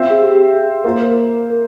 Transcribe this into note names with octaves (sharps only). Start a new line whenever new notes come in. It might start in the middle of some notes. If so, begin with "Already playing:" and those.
Already playing: C4 F4 C5 E5
G#4
G4
G#4
A#3 F4 A#4 C5
A#4
A#4